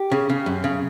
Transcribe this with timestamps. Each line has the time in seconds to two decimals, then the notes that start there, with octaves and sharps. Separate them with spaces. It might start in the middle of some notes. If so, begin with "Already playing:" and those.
Already playing: G4
0.12 C#3
0.30 C#3
0.46 F#2
0.64 C#3